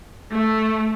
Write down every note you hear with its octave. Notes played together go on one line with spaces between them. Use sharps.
A3